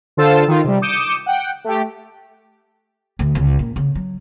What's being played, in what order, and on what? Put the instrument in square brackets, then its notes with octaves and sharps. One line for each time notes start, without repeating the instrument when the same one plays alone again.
[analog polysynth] D3 F4 A4 C5 A5 E6
D#3 F4
C3 G3
D6 D#6 G6 C#7 D#7 E7
F#5 G5
A3 G4
[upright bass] D2
C#2
A#2
C#3
F#3